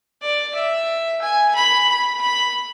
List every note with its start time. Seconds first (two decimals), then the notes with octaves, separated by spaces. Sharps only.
0.21 D5
0.54 E5
1.22 G#5
1.55 B5
1.89 B5
2.21 B5